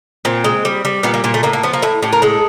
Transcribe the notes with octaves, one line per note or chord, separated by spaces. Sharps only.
A#2 C4
G#3
G3
G3
A#2 B3
A#3
A#2 A#3
A3
A2 A#3
A#3
F3 B3
A#3
A2 E4
A2 G4
A#4
G#3 A4